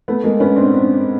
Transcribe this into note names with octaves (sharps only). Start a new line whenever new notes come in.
A3 B3
G#3 A#3
B3 C#4
C4 D4
C4 D4